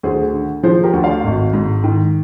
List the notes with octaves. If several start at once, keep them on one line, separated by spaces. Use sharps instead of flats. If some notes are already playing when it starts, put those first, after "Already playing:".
D2 G#4 C5
D3
F3 G#4 C5
G4 A#4
D2
D5 F5
G#1
G#2
D#3